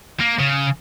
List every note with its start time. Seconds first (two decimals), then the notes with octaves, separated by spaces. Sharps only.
0.20 A#3
0.40 C#3